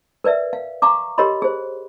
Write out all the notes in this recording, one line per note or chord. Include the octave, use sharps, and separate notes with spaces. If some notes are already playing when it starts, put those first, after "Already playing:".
A#4 B4 D5 E5
F5
F5 A#5 C#6 D6
G4 A#4 C#5 D#5 B5 C6
G#4 C5